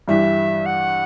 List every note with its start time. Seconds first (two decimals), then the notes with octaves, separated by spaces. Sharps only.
0.08 G2 E3 G3 E5
0.66 F#5